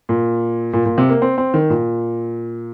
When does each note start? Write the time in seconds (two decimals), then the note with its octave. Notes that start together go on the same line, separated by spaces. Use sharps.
0.09 A#2
0.73 A#2
0.86 A#2
0.98 C3
1.10 A#3
1.22 C4
1.38 C4
1.54 D#3
1.70 A#2